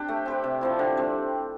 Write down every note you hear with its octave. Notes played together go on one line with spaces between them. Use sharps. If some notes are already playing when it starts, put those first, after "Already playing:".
Already playing: C4 D4 G4
A3
C4 G4 B4
C3
F3 C4 E4
D3
G3 C4